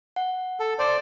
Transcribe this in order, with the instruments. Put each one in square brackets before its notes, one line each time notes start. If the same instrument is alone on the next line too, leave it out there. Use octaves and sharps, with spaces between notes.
[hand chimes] F#5
[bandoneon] A4
[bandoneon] C5 D5 [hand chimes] A5